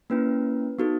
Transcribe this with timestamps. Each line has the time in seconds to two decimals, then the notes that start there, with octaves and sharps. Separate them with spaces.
0.10 A#3 C#4 E4 B4
0.79 B3 D#4 F#4 A4